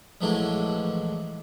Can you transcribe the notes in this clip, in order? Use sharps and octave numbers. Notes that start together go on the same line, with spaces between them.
A#1 E3 F#3 G#3 A3 D4